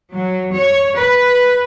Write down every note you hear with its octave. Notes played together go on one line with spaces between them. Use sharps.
F#3
C#5
B4